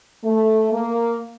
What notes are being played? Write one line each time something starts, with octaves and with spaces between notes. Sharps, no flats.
A3
A#3